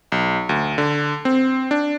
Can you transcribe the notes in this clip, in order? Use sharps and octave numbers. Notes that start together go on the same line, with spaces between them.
B1
D2
D3
C4
D4